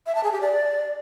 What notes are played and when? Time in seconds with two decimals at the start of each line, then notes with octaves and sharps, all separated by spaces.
0.06 E5
0.15 A5
0.24 G#4
0.32 G4
0.41 D5